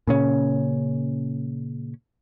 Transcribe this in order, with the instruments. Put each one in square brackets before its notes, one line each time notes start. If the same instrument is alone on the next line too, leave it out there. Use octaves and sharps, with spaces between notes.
[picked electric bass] A#2 C#3 C#4